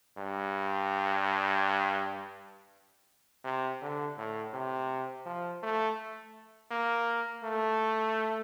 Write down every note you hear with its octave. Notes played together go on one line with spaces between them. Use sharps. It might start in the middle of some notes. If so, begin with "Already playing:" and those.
G2
C3
D3
A2
C3
F3
A3
A#3
A3